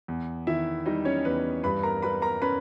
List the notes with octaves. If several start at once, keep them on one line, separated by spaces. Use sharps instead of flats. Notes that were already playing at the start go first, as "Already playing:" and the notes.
E2
D#3 E4 E5
G3 D#4 D#5
C#4 C#5
E2 B4
G2 B4 B5
A#4 A#5
G3 B4 B5
A#4 A#5
C#4 B4 B5